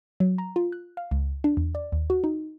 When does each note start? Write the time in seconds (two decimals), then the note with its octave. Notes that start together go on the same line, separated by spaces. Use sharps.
0.20 F#3
0.38 A#5
0.56 F4
0.72 F#6
0.97 F5
1.11 C#2
1.44 D4
1.57 E2
1.75 D5
1.92 D#2
2.10 F#4
2.24 D#4